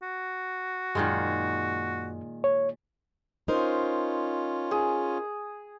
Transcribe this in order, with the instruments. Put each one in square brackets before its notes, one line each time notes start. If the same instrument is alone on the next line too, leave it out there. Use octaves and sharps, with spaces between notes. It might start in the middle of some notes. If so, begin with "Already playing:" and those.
[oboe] F#4
[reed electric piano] F#2 [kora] A#2 D#3 G#3
[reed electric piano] C#5
[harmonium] C#4 F4 [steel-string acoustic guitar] D#4 A#4 C5
[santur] G#4